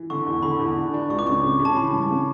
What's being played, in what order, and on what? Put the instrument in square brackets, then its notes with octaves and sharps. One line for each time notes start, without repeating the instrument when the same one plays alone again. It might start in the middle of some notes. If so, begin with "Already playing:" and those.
Already playing: [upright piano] E3
[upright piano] D3 [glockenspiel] C#6
[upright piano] E2
[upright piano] D3 [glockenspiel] B5
[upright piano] E2
D4
D4
[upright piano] C#2 [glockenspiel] C#6
[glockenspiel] D6
[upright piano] C#3 [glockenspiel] C#6
[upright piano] C#3
C#3
[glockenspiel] A5
[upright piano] E3 [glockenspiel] B5
[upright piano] G2
C#3